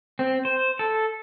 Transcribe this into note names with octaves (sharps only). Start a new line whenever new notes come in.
C4
C5
A4